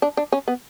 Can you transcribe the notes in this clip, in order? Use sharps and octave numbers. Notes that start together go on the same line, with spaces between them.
D4
D4
C#4
B3